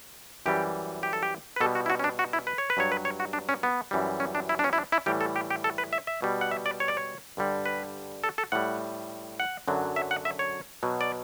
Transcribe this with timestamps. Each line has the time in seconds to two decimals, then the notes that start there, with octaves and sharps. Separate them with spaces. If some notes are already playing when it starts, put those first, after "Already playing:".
0.46 F#2 E3 G3 G4
1.03 G4
1.13 A4
1.23 G4
1.56 B4
1.61 B2 A4
1.64 G3
1.75 F#4
1.86 E4
1.90 F#4
1.99 C#4
2.04 D4
2.19 F#4
2.33 E4
2.47 B4
2.58 C#5
2.70 B4
2.77 G2 F#3 C#5
2.92 B4
3.05 C#5
3.20 F#4
3.33 D4
3.49 C#4
3.63 B3
3.91 F#2 E3 G3
4.20 C#4
4.35 D4
4.49 E4
4.59 D4
4.64 C#4
4.73 E4
4.78 D4
4.92 E4
5.06 A2 E3 G3 G4
5.21 A4
5.36 G4
5.50 G4
5.64 A4
5.78 B4
5.93 E5
6.07 E5
6.22 B2 G3
6.41 F#5
6.51 E5
6.66 D5
6.80 C#5
6.88 D5
6.97 C#5
7.37 G2 D3 G3
7.66 B4
8.24 A4
8.38 A4
8.52 A2 G3 F#5
9.40 F#5
9.68 F#2 D3 F#3
9.96 E5
10.11 F#5
10.25 E5
10.39 C#5
10.83 B2 F#3
11.01 D5